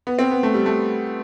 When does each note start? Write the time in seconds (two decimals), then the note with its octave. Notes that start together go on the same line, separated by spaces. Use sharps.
0.07 B3
0.19 C4
0.31 B3
0.43 A3
0.54 G3
0.66 A3